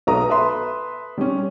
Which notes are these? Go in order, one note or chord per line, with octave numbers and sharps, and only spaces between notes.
B1 B3 A#5 D#6
A4 B4 E5 C6
G3 C#4